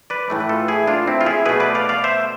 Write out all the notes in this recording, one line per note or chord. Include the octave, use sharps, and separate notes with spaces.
B4 D5
A2 E3 A3
B4
F4 A4
E4 G#4
D4 F4
C4 E4
F4
E4 G#4
B2 A3 G#4 B4
B4 D5
D5 F5
D5 F5
C5 E5